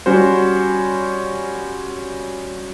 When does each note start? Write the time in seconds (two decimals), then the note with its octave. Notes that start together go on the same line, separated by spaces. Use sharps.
0.06 G3 C#4 F#4 C5